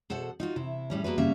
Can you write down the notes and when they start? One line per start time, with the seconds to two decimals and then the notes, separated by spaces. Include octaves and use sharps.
0.10 B2 A4 C5 F#5
0.40 D#4 F4 F#4
0.56 C3 E4
0.90 A2 G3 C#4
1.04 A#3 B3 F#4 B4
1.18 G2 C#3 G3 A#3 C#4 E5